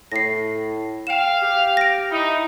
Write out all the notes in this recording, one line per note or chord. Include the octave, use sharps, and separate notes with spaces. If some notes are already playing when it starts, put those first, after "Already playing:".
A2 A#6 C7
F5 G5 E7
G4
A#6 D7
D#4 E4